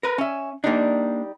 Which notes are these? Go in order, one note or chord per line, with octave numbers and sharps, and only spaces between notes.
A#4 B4
C#4 E5 G#5
G3 A#3 D4 D#4